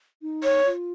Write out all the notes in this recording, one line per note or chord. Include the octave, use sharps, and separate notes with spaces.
D#4
C#5
F4